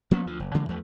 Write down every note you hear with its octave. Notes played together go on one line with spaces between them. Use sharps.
F3 A#3 B3 C#4
D2 F3
F#1
C#3 E3 G#3 A#3
E2 F3 A3